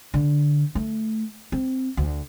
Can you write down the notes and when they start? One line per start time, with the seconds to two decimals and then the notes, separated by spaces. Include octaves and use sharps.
0.14 D3
0.75 A3
1.52 C4
1.97 D2